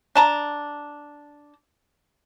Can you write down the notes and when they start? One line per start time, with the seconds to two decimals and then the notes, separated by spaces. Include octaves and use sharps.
0.16 D4 A5 A#5